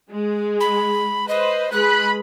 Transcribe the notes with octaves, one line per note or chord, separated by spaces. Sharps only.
G#3
B5
B4 C5 D#5
G#3 B4 B5 F#6